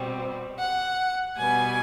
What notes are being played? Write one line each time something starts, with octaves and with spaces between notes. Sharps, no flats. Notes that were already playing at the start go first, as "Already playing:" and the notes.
Already playing: B2 G3 C4
F#5
B2 G3 B3 G#5